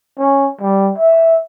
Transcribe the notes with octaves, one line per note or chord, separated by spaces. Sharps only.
C#4
G3
E5